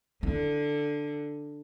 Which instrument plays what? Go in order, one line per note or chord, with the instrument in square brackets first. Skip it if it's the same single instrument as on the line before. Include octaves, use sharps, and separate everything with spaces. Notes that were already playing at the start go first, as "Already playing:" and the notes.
[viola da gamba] D3 [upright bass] E4